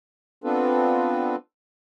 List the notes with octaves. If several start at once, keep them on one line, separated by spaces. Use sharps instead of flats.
B3 C4 D4 F4 A4 B4